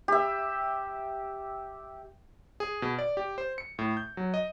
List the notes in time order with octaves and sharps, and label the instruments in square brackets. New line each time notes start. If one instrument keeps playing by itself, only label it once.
[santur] G4 E5
[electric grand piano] G#4
B2
D5
G4
C5
C#7
A2
G6
F#3
D#5